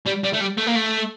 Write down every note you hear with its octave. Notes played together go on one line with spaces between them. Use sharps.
G3
G3
A3
G3
A3
A#3
A3